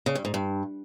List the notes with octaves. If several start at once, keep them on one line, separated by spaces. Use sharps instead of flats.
C#3
G2
G#2
G2